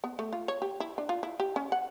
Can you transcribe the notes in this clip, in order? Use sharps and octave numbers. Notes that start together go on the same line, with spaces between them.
B3
A3
F4
C#5
G4
E4
D4
F4
E4
G4
C#4
F#5